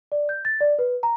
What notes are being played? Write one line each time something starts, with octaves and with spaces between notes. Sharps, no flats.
D5
G6
A6
D5
B4
A#5